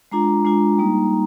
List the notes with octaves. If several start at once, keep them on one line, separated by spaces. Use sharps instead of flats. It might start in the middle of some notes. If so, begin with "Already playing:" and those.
G#3 D4 F4 A#5
G#3 D4 F4
G3 A#3 D#4